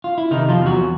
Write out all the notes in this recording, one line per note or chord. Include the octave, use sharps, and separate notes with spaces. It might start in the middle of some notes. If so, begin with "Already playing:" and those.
F4
E4
C3 D#3 D#4
F3 F4
E2
F#3 F#4